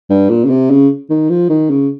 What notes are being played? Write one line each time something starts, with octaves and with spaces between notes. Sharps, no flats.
G2
A#2
C#3
C3
C#3
D#3
F3
D#3
C#3